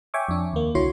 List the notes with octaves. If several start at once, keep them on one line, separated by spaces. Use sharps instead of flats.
C#5 E5 G5 G#5 C#6 D6
F2 D4
D#2 A#3
C2 D3 E4 F#4 C#5 C6